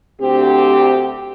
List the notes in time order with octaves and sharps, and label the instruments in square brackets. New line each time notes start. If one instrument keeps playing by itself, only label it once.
[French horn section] D2 C4 G4